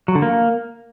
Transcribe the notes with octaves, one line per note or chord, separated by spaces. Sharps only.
F#3
D3
A#3